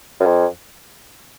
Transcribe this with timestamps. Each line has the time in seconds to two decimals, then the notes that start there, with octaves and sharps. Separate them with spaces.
0.20 F#2
0.26 F2